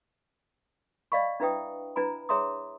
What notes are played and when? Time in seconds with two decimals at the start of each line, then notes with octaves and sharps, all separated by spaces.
1.12 D5 D#5 F5 B5 C#6
1.40 D4 E4 B4 E5 G5 D#6
1.96 D4 E4 B4 G#5 A#5 B5
2.29 G#4 C#5 E5 A#5 C6 D#6